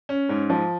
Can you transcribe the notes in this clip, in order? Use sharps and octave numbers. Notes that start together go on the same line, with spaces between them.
C#4
G#2
F3